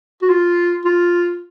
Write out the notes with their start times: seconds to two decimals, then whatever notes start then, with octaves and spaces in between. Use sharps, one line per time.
0.22 F#4
0.30 F4
0.85 F4